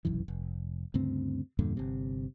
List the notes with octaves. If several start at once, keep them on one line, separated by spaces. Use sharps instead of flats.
F1 B1 F#2 E3
F1
D2 G2 C#3 C4
E2 G2 A#2 D3
G1 C3